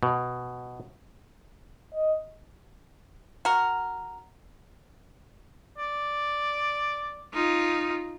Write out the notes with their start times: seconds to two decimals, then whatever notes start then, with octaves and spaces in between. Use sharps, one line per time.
0.03 B2
1.93 D#5
3.45 F#4 A#4
5.78 D5
7.34 D#4 F4